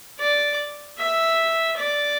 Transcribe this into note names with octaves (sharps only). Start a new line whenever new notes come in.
D5
E5
D5